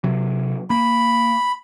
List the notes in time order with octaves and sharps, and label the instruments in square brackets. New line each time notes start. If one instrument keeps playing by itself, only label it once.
[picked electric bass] C3 F#3
[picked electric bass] A#3 [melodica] B5